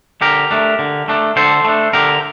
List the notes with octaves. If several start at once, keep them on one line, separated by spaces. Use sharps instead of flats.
D3 G4 A#4
A3 D4
D3
A3 D4
D3 A4 C5
A3 D4
D3 G4 A#4